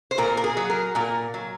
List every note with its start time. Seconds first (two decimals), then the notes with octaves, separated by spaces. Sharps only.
0.11 C5
0.18 A#2 A#4
0.37 A#4
0.44 G#4
0.57 F#3
0.70 A#4
0.95 A#2 A#4
1.34 F#3